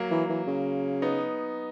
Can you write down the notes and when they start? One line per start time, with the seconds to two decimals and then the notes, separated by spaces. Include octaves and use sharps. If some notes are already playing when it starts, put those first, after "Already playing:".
Already playing: F#3 A#3
0.11 E3
0.29 E3
0.47 C#3
1.02 B3 D#4